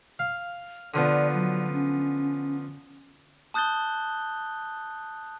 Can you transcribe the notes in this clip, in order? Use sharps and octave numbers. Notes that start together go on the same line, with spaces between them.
F5
D3 F3 B3 D5
F#3
C#4
A5 D#6 F#6 G6 A6 G7